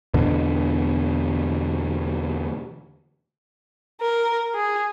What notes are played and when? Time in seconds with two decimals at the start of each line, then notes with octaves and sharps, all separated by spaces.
0.14 E2 B2 D3
4.01 A#4
4.55 G#4